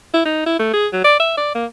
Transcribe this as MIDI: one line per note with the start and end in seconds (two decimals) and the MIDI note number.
0.13 0.23 64
0.25 0.45 63
0.46 0.58 64
0.59 0.71 57
0.73 0.87 68
0.93 1.02 54
1.04 1.16 74
1.20 1.34 76
1.37 1.53 74
1.55 1.65 58